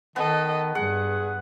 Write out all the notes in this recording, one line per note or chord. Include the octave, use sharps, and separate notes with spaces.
D#3 B3 A4 D#5
G2 G#4 F#5